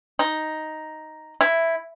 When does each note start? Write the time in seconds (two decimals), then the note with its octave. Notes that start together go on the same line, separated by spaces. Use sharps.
0.19 D#4
1.41 E4